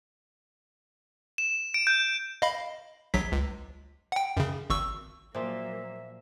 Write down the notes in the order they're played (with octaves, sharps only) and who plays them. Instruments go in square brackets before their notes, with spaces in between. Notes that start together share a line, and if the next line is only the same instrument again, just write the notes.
[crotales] E7
D7
G6
[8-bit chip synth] D#5 F5 B5
A#1 F#3 B6
C#2
F#5 G5
F#2 C#3
G#1 C#6 E6
[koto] A#2 F3 [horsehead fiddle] F#3 A#3 [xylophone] C5 [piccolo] E5